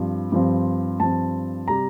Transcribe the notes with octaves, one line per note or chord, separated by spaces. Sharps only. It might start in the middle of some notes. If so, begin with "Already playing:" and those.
Already playing: G2 F3 C4
G2 F3 C4
G2 F3 C4 A5
C3 G3 A#5